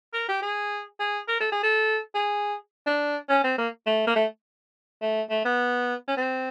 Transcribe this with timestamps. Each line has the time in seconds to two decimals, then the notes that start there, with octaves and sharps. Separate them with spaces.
0.13 A#4
0.28 G4
0.42 G#4
1.00 G#4
1.28 A#4
1.40 A4
1.52 G#4
1.63 A4
2.15 G#4
2.86 D4
3.29 C#4
3.44 C4
3.58 A#3
3.86 A3
4.07 A#3
4.15 A3
5.01 A3
5.30 A3
5.45 B3
6.08 C#4
6.17 C4